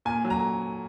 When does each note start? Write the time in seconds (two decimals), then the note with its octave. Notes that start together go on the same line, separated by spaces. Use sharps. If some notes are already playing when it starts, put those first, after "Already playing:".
0.05 A#2 G#5
0.24 F#3
0.30 A#5